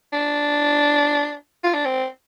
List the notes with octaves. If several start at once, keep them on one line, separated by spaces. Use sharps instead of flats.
D4
F4
D4
C4